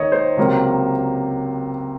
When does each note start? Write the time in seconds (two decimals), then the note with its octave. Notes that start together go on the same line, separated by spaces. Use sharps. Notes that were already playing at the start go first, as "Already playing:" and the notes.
Already playing: D#2 D#3 A#3 C#5 D#5
0.12 C5
0.37 C#2 C3 F#3 A#3